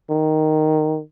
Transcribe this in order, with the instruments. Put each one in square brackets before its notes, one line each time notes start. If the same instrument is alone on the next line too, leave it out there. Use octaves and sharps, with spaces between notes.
[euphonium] D#3